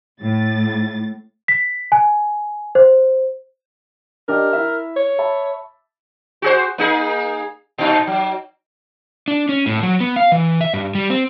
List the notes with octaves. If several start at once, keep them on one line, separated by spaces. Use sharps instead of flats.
A2 A6
B6
G#5
C5
D4 G4 A#4 D#5
E4 E5
C#5
E5 A5 B5
F#4 G#4 C5
A#3 D#4 G#4
A#2 D#4
F#3
D4
C#4
A2
F#3
B3
F5
E3
E5
G2
G3
C4